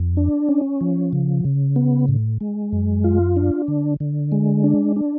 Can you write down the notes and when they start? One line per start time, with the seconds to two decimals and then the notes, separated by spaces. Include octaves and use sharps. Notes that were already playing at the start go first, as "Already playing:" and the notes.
Already playing: F2
0.17 D4
0.49 C#4
0.81 F3
1.13 C#3
1.45 C#3
1.76 B3
2.08 A2
2.41 G#3
2.72 F#2
3.04 F4
3.37 D4
3.68 D3
4.00 D3
4.32 G#3
4.64 D4
4.96 D4